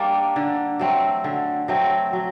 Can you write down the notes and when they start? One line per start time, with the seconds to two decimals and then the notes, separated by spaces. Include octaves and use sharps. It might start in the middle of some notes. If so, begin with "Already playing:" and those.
Already playing: G3 A#3 D4
0.36 D3
0.79 F#3 A3 C4
1.24 D3
1.68 F#3 A3 C4
2.13 F#3